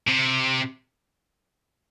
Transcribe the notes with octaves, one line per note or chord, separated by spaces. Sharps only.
C3